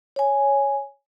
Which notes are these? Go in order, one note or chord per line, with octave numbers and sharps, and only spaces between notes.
C#5 G#5